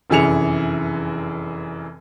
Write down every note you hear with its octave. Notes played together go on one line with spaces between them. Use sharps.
F1 F#2 E3 G#4 C#7 F7